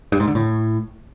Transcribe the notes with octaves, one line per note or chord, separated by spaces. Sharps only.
G2
G#2
D3
A2